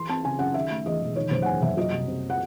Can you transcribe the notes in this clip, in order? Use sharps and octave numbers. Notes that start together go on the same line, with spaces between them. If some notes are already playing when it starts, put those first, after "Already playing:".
Already playing: E3 C6
C4 A5
C#3 G#5
F#2 F#5
D#3 E5
A3
E2 D#5
E1
D#3 C#5
F#1 C5
F#5
E2 G#5
F#1 E5
F#3 D#5
C2
C3
F#5